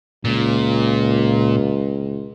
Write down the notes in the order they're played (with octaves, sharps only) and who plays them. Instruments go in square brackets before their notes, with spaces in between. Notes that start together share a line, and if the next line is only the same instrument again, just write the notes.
[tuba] C#2 [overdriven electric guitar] A#2